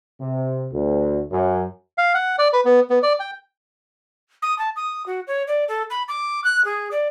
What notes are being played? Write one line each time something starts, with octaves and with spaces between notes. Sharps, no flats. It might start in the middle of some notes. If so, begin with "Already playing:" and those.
C3
D2
F#2
F5
F#5
D5
B4
B3
B3
D5
G5
D#6
A5
D#6
F#4
C#5
D5
A4
B5
D6
F#6
G#4
D5